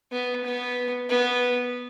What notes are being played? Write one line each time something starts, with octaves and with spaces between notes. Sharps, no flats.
B3
B3
B3